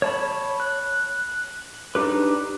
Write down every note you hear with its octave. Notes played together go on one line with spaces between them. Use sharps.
C#5 A5 B5
F#6
D4 D#4 G4 B4